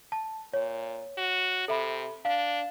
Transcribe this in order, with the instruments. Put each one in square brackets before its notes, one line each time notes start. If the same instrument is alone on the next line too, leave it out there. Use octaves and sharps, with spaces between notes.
[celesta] A5
[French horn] A#2 [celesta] C#5
[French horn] F#4
[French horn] C3 [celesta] A4 E5 B5
[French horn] D4 [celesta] F5